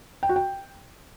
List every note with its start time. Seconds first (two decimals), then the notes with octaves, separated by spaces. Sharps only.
0.23 G5
0.29 F#4
0.36 G5